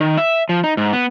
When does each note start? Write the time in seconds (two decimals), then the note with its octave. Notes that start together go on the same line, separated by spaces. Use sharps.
0.01 D#3
0.17 E5
0.49 F3
0.64 D#4
0.77 G#2
0.93 B3